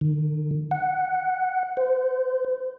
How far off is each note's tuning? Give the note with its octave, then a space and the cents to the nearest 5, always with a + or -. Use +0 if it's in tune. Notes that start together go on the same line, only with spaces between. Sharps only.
D#3 -45
F#5 +0
C5 -30